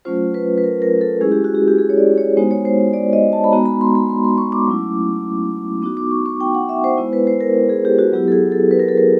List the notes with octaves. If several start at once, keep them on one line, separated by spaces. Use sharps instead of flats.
F#3 A3 C#4 F4 C5
B4
B4
A#4
A#4
A4
G#3 C#4 E4 G#4
G4
F#4
G4
G4
G#4
C#5
D5
C#5
G#3 B3 D#4 F#4 C5
C#5
C5
C#5
D5
D#5
A5
B5
G#3 B3 D#4 F#4 A#5
B5
C6
B5
C6
C6
C#6
D6
F#3 A3 C#4 E4
B3 D#4 F#4 D6
D6
C#6
C#6
G5
F#5
E5
C5
G#3 B3 E4 C5
B4
C5
A#4
G#4
G4
F#4
F#3 B3 E4 G4
A4
G#4
A4
B4
A#4
A4
A#4